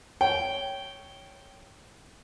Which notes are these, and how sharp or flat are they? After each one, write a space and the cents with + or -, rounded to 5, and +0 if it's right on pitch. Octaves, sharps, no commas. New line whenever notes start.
C#5 +0 G5 -10